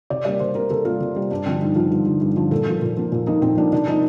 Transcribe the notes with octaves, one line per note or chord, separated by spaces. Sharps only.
C3 D5
G3 A#3 D5
C3 C5
G3 A#3 A#4
C3 A4
G3 A#3 F4
C3
G3 A#3
G2 D4
D3 F3 C4
G2 D#4
D3 F3 F4
G2
D3 F3
G2
D3 F3
A#2 A4
F3 A#3
A#2
F3 A#3
A#2
F3 A#3 D#4
A#2 C4
F3 A#3 D4
C3 D4
F3 A#3 D#4